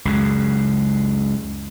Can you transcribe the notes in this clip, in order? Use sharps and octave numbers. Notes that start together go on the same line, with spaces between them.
C#2 F#2 C#3